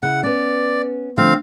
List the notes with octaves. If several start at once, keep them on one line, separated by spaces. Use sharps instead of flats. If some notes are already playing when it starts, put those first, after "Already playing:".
C#3 E4 F#5
B3 C#4 D5
D3 F3 A3 C4 F5